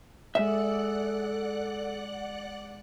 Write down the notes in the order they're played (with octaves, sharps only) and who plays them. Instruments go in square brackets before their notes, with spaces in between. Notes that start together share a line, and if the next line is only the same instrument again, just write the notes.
[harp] G#3 E6 [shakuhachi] A4 [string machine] D5 F#5 F#6 [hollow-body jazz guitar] E5